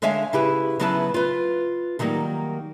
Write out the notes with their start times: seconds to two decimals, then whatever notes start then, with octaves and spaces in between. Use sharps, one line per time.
0.02 D3 G#3 C#5 E5 F5 G#5
0.33 C#3 E4 G4 B4
0.80 C#3 F#3 B3 E4 B4 A5
1.14 F4 B4
1.99 D3 D#3 F#3 G3 A#3